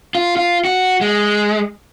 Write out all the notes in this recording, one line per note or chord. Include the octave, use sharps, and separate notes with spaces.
F4
F4
F#4
G#3